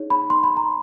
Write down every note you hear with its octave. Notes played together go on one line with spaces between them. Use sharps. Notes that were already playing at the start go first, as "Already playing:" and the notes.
Already playing: D#4 G#4 C#5
B5
C6
B5
A#5